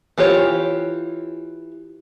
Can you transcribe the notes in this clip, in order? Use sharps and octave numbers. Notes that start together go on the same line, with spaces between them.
E3 F4 G4 C#5